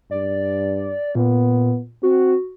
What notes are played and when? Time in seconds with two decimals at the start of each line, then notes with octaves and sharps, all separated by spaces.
0.11 G2 D5
1.15 A#2 B3
2.03 C4 F#4